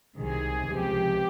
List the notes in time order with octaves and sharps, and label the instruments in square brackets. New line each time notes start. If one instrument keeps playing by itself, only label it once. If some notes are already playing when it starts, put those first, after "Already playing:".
[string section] C2 C3 D#3 [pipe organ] G#4
[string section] C#2 C3 F3 [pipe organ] G4